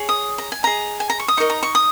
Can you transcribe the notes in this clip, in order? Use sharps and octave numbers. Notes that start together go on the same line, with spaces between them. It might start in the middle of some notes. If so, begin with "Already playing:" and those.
Already playing: G#4 C#5
D#6
A#5
G#5
G#4 D#5 A#5
G#5
A#5
C#6
D#6
D#4 A#4 D#5 C#6
A#5
C#6
D#6